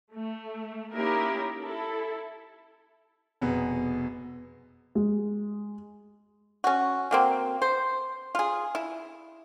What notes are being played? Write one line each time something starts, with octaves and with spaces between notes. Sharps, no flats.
A3
A#3 C#4 D#4 E4 G4 A#4
E4 A4
F1 B2 B3 G#4
G#3
C#4 F#4
F#3 A#3 C4
C5
F4 G#4
E4